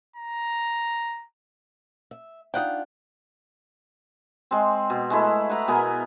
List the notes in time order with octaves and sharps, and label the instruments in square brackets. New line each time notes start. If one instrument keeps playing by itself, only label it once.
[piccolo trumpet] A#5
[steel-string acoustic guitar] E5
[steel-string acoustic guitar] D4 F4 [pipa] D#4 F#5 G5
[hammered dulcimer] G#3 C4
B2
G#3 A3 E4
B4 F#5 A#5 B5
B2 B3 G#4 A#4